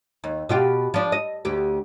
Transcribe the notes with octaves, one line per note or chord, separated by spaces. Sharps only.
D#2
B2 F4 G4
F3 D4
D#5
D2 G4